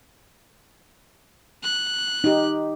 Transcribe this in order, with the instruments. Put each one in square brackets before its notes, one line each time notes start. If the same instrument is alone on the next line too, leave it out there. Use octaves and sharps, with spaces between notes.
[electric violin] F#6
[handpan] D#4 G4